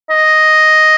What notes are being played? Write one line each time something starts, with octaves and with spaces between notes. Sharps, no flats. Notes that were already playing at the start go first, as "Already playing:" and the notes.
D#5